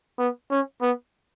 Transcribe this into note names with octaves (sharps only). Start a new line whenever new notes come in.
B3
C#4
B3